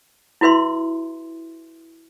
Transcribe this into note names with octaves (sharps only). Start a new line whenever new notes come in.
E4 F#4 B4 E5 C6